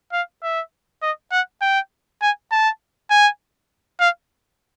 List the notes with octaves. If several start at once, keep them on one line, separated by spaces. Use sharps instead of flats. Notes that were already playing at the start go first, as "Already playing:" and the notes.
F5
E5
D#5
F#5
G5
G#5
A5
G#5
F5